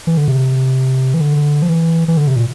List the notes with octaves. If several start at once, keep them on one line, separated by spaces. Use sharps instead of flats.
E3
D3
C3
E3
D3
F3
E3
E3
D3
C3
A#2